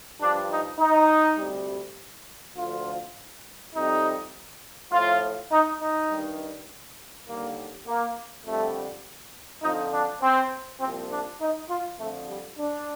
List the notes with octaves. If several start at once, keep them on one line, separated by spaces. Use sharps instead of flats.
G2 F3 D4
D#4
D#4
D2 C3 G3
D2 D3 F3 F4
F2 C3 G3 D#4
A2 F3 F4
D#4
D#4
G2 D#3 G3
D#2 D3 G3 A#3
A#3
F2 D3 G3 A3
F2 D3 F3 D#4
D4
C4
C2 A#2 F3 C4
D4
D#4
F4
F2 D3 F3 A3
G3
D4